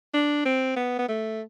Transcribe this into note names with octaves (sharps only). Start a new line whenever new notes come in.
D4
C4
B3
B3
A3